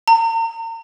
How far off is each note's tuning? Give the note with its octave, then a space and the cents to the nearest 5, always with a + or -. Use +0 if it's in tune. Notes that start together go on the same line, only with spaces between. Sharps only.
A#5 -40